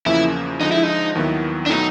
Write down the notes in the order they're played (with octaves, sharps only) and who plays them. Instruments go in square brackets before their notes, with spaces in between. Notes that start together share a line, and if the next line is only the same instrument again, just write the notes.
[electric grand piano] E2 C#3 F3 A#3 [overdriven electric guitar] E4
[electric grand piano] D3 F3 G#3 [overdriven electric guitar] D#4
[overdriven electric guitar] E4
D#4
[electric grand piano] D#2 D#3 F#3 B3 E4
[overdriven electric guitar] D4
[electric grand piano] B2 F#3 A3 [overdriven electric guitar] D#4